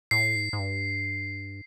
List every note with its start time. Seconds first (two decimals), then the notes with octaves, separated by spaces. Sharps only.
0.11 A2 C7
0.36 G#2
0.53 G#2
0.59 G2